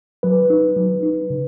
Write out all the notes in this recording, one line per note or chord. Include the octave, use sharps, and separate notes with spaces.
F#3 B4
D#4
F#3
D#4
C#3